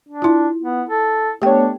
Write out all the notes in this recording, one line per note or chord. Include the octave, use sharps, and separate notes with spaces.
D4
E4 F4
B3
A4
A3 B3 D4 G4 C#5 G5